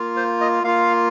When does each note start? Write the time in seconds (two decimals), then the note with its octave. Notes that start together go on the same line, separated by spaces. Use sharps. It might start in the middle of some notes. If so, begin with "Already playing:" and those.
Already playing: A#3 F4
0.17 C5
0.41 D#5
0.63 A#3 F4 F5